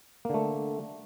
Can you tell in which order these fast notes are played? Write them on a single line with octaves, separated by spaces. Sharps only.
A#3 D3 A3